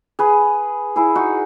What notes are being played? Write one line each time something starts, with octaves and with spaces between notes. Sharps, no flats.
G#4 B4
E4 G#4
D#4 F#4